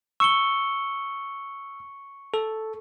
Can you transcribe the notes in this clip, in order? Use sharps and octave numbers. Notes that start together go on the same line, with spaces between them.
C#6 E6 C#7 G7
A4